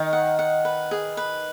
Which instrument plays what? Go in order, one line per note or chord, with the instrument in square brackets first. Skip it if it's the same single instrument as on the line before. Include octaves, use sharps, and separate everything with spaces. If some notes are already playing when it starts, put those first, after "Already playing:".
Already playing: [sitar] D#3
[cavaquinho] F#5
F#5
B4
G#4
B4